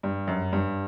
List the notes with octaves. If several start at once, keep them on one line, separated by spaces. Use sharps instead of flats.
G2
F#2
G2